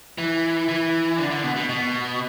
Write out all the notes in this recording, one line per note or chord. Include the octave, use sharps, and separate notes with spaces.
E3
E3
D3
D3
B2
B2
B2